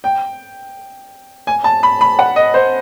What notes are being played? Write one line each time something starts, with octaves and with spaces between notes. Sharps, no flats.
G5
G#5
A5
B5
B5
F#5
D#5
C5